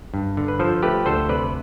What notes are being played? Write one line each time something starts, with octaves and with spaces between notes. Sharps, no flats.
G2
D3
B4
F3 A4 C5
A3 G4 B4
D2 A4 C5
C3 B4 D5